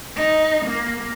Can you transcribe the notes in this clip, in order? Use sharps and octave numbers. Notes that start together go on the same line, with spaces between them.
D#4
A#3